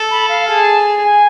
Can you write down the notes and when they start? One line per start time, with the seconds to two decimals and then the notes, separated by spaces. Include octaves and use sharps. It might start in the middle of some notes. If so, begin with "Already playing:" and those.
Already playing: A4
0.11 B5
0.29 F5
0.48 G#4 A5
1.04 G#5